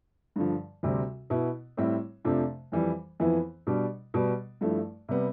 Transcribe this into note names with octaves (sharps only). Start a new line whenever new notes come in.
G2 D3 F3
D2 C3 G3 C4
B2 B3 E4
A2 G3 C4 E4
F2 C3 F3 A3 D4
F2 E3 G3
F2 E3 B3 E4
B2 G3 D4
B2 G3 B3
G2 F3 A3 E4
C3 G3 B3